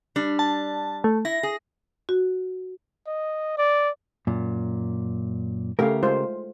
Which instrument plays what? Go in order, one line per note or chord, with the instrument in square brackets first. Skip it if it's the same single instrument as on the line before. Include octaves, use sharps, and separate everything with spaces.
[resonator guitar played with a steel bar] G3 D4
[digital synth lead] A5
A3
[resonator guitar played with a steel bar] E4 [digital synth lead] A#6
[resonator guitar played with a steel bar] G#4
[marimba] F#4
[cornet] D#5
D5
[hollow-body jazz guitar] F#2 A#2
[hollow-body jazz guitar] C#3 G4 A#4 [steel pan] A3 F5
[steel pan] G#3 F4 C5